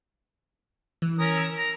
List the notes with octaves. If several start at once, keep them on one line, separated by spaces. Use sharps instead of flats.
E3
C#4 A#4 D#6
E6
A#5